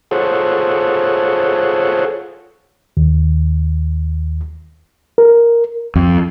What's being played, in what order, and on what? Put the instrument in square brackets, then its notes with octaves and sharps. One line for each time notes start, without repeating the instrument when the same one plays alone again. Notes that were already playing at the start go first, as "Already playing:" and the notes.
[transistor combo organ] F4 G#4 A4 C5 C#5 F#5
[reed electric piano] D#2
A#4
[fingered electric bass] F2